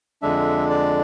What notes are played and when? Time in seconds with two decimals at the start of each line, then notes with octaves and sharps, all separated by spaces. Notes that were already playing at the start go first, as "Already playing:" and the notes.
0.22 F2 D3 G#3 D4 E5
0.70 D5